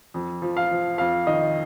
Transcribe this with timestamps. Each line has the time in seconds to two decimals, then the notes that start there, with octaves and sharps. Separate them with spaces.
0.14 F2
0.42 F3
0.57 F5
0.71 F3
0.98 F2 F5
1.27 D#3 D#5